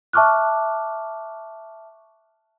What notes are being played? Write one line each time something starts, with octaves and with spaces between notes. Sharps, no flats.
E5 A5 C#6 D6 F6 F#6